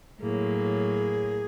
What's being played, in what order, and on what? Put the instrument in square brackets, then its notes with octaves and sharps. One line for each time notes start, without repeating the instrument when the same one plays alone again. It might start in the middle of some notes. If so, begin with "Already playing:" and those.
[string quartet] A2 F#3 A#3 [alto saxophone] G#4